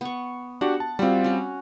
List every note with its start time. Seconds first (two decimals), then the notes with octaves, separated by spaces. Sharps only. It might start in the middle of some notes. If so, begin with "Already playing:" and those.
0.01 B3 C#6
0.61 D4 F#4 G4 F#5
0.80 A5
0.99 G3 C4 F4 F#4
1.24 C#4 F#4